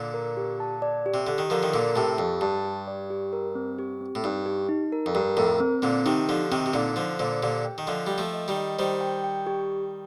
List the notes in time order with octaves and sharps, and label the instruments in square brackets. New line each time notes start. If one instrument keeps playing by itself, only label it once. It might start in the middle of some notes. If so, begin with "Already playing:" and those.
Already playing: [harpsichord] A#2 D3
[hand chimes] A#4
G4
A5
D5
G4
[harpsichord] C3
[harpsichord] D3 [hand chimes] G4
[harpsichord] D#3
[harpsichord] D3 F3 [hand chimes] A#4
[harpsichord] D#3
[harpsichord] A#2 D3 [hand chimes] A#4
[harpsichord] A2 C3 [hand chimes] A5
[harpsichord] F2 [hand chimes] G4
[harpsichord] G2 [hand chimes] A5
[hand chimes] G4
D5
G4
A#4
C4
G4
C4
[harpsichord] A2
[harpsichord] G2 [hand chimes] D#4
[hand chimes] G4
D#4
A#4
[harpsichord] F2
[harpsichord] G2 [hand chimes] A#4
[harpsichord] F2 A2 [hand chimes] A#4
[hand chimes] C4
[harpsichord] A#2 D3 [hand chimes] C4
[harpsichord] C3 D#3 [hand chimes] D#4
[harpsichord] D3 F3 [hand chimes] G4
[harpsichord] C3 D#3 [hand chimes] C4
[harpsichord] C3
[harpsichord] A#2 D3 [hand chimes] D#4
[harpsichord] D3 F3 [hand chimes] C5
[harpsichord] A#2 D3 [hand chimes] C5
[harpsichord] A#2 D3 [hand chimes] G4
[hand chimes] G5
[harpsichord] D#3
[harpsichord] D3 F3 [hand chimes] D#5
[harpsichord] G3 [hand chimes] G5
[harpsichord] F3 A3
[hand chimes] D#5
[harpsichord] D#3 G3
[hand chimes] D#5
[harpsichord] D#3 G3 [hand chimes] C5
[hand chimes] G5
G5
G4